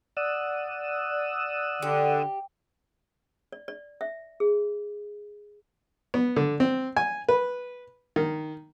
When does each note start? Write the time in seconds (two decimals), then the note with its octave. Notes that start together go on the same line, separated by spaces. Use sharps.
0.17 D5 F#5 D#6 E6
1.82 D3 G4
3.52 D5
3.68 D5
4.01 E5
4.40 G#4
6.14 B3
6.36 D3
6.60 C4
6.97 G#5
7.29 B4
8.16 D#3